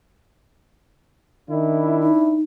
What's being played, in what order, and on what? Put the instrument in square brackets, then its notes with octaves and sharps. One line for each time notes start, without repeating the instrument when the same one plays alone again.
[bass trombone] D#3 [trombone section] D4 E4
[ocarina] D#4